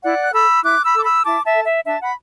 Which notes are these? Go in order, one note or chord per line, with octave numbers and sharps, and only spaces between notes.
E4 D5 F#5
F#6
A4 B5 E6
E4 D6 F#6
B5 E6
A4 D6
B5 E6
E4 A5 D6
E5 A5
A4
E5
D4 E5 A5
F#5 B5